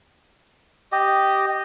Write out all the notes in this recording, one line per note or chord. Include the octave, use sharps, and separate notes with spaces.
G4 D#5